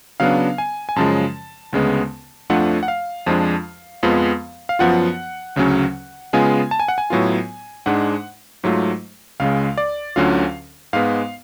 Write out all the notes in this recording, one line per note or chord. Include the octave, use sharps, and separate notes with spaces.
C#3 F#3 B3 D4 F5
G#5
G#5
F#2 C#3 F3 G#3 A5
D2 C#3 G#3 B3
F2 F3 A3 D4 F4 F#5
F#5
F5
F2 F3 G#3 D4 F4
F2 F3 G#3 B3 F4
F5
F#2 F3 B3 F4 F#5
D2 C#3 F#3 C#4
C#3 G#3 B3 F4 G#5
A5
G#5
F#5
G#5
A2 F#3 B3 F4
G#2 G#3 D4 F#5
G#2 F#3 A3 F4
C#2 C#3 G#3 F5
D5
D2 D3 F#3 C#4 F4 F5
G#2 G#3 B3 F5